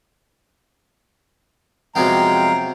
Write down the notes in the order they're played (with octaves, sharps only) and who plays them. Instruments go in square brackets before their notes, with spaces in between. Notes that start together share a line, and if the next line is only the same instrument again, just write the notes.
[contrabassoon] F2 [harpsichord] C3 F#3 B3 [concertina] G#3 F5 G5 [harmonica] A#5